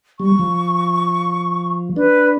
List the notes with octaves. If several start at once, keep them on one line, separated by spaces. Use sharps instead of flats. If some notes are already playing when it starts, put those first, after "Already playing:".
G3 C#6
F3
D4 B4